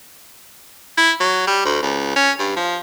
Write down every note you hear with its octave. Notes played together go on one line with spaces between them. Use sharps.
E4
F#3
G3
D2
C#2
C#4
G2
F3